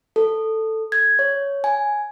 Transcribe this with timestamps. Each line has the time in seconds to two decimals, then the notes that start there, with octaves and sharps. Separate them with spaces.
0.16 A4
0.92 G#6
1.19 C#5
1.64 G#5